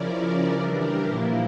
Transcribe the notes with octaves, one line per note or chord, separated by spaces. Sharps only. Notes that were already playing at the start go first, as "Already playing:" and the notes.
Already playing: C#3 F3 C#4 E4 A#4 D5
E3 G3 D4 A#4 D5
G4 A#4
A#2 F3 A#3 E4 G4